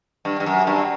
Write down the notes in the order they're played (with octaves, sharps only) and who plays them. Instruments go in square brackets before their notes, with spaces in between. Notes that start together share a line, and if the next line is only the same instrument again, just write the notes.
[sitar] G2
G2
F#2
G2